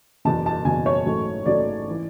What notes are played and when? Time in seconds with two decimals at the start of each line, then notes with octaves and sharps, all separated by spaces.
0.25 F#1 E2 B2 A5
0.46 A5
0.65 F#1 E2 B2 G#5
0.86 C#5
1.05 A1 G#2 F#3 A3
1.45 A1 G#2 F#3 A3 D5
1.90 E3